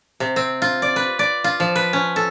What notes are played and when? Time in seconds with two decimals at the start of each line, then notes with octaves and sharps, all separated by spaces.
0.20 C3
0.36 C4
0.62 F4
0.82 D5
0.96 B4
1.19 D5
1.44 F4
1.60 F3
1.76 B4
1.93 C#4
2.16 A4